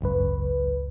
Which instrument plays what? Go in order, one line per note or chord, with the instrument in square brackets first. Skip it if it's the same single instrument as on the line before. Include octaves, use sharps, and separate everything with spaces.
[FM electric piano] G#1 C#2 F#2 B4